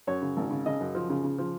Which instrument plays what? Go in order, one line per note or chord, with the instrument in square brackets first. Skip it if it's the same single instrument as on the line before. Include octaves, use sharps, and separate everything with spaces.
[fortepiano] F#2 C#5
C#3
G#1
C#3
C#3 D#5
F#2
F3
C#3
C#3
F3